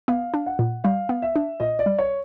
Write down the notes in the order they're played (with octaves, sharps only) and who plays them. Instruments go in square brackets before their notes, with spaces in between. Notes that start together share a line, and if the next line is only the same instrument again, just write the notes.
[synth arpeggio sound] B3 [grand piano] F5
[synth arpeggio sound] D4
[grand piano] F#5
[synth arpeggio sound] A#2
[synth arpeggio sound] G3 [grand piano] F5
[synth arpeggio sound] B3
[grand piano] E5
[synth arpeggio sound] D4
[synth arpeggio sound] A#2 [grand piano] D#5
[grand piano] D5
[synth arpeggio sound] G3
[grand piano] C#5